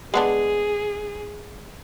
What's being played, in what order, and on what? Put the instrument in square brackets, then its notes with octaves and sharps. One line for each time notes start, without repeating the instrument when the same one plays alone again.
[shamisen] G#3 B3 D4 [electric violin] G#4